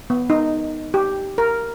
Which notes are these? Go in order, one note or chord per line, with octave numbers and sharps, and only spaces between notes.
B3
D#4
G4
A#4